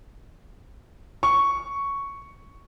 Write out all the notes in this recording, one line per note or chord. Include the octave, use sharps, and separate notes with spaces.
C#6